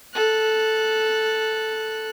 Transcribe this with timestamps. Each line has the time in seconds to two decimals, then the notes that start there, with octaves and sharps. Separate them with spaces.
0.14 A4 F#6